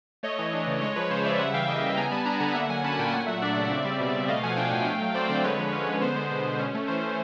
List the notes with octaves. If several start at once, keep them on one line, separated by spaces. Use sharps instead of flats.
A3 C#5 D#5
E3
D4
C#3
G#3 C#5 D#5
F3 B4 C#5
C#3 C5
C#3 D5 E5
G3 E5 F#5
E3 F5 G5
A#3 D#5 F5
C#3
B3 G#5 A#5
G3 A5 B5
D4 G#5 A#5
D3 F#5 G#5
A#3 E5 F#5
F#3 F#5 G#5
C#4 A5 B5
A#2 G5 A5
A3 F#5 G#5
F#3 E5 F#5
D4 D5 E5
C#3
C4
G3
B2
B2
A3 D#5 F5
F3 F#5 G#5
D4 F5 G5
A2
A3
F#3
C4 C5 D5
D3 C5 D5
G#3 B4 C#5
F3
C#4
D3
B3 C5
G#3
B2
B2
C#4
A3
E3 C5
E3